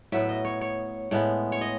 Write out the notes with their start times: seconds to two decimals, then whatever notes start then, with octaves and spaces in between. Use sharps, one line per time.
0.12 A2 F#3 B3 E5
0.29 D#5
0.45 C#5
0.61 C#5
1.11 A2 G#3 B3
1.52 C#5
1.61 D#5